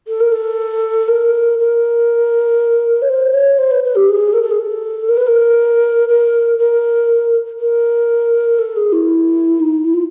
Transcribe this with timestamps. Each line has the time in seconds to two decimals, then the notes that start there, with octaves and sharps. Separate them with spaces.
0.07 A4
0.20 A#4
0.32 A4
1.08 A#4
1.58 A#4
3.02 C#5
3.09 C5
3.33 C#5
3.58 C5
3.71 B4
3.84 B4
3.95 G4
4.09 G#4
4.33 A#4
4.42 A4
4.50 G#4
4.59 A4
5.08 A#4
5.17 B4
5.26 A#4
6.08 A#4
6.58 A#4
7.59 A#4
8.59 A4
8.76 G#4
8.92 E4
9.60 D#4
9.84 E4
9.93 F4